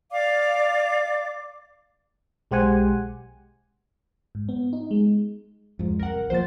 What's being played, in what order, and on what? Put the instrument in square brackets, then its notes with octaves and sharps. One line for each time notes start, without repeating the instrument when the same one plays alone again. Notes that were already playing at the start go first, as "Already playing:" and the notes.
[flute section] D5 F5 D6
[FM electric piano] B1 G#3 G4 C5 F#5 G#5
G#2
B3
D#4
G#3
[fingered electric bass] F2 G#2
[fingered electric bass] C2 [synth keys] A#4 F#5
[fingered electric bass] D1 F3 A#3 [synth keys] C5 A6